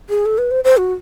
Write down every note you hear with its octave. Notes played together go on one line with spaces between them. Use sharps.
G#4
A4
B4
C5
C5
F#4